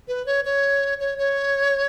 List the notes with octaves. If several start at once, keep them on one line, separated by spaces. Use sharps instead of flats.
B4
C#5
C#5
C#5
C#5